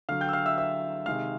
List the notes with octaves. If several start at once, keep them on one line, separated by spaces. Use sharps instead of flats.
D3 F#3 F5 F6
G5 G6
E6
F5 F6
E5 E6
E5 E6
C3 D#3 G#3 F5 F6